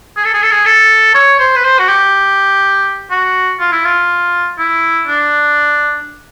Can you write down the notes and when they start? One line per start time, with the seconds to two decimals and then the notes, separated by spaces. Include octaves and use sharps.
0.17 G#4
0.25 A4
0.34 G#4
0.43 A4
0.51 G#4
0.66 A4
1.15 C#5
1.39 C5
1.56 B4
1.64 C5
1.79 F#4
1.89 G4
3.11 F#4
3.60 F4
3.72 E4
3.85 F4
4.58 E4
5.07 D4